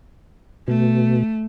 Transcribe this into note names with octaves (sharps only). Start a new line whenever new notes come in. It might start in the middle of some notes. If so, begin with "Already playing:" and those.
B2 A3